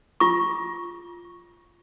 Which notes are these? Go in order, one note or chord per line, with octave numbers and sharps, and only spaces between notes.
F4 C#6